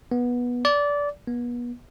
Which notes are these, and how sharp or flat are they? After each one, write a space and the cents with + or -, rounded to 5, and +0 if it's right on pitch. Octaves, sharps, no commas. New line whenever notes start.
B3 -15
D5 -20
B3 -35